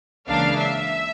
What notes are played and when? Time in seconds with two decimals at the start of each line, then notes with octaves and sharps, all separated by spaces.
0.28 C#2 C#3 E3 A#3 D4 F5
0.59 E5